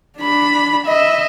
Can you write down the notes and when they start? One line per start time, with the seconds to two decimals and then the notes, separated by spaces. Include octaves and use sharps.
0.19 D4 B5
0.86 D#5 E5